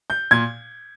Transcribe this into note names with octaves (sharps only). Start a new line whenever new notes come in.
G6
A#2 G#6